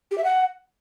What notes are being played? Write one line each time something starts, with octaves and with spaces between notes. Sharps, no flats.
G4
E5
F#5